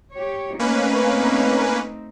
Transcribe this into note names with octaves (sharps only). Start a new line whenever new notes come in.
G4 C#5
A3 A#3 C4 C#4 D#4 B4